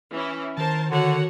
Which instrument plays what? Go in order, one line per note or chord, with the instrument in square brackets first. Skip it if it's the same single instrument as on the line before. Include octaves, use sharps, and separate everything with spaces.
[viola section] E3 C#4 E4
[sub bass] D#3 [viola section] A#4 C5 A5
[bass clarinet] D3 [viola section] F#4 C#5 F#5